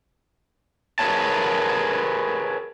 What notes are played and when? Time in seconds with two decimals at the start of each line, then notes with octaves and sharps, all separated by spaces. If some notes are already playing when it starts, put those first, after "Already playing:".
0.99 G#4 A#4 B4 C#5 A5